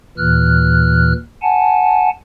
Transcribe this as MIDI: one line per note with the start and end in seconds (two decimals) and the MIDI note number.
0.18 1.13 39
0.18 1.13 46
0.18 1.13 52
0.18 1.13 89
0.18 1.13 90
1.42 2.10 78
1.42 2.10 80
1.42 2.10 81